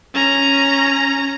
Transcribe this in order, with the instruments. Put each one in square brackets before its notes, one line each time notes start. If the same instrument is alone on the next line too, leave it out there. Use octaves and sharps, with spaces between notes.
[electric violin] C#4 A#5